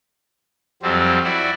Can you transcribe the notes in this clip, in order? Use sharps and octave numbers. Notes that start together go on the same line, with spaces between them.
F2 F#3 G3 C4
E4 F#4 D5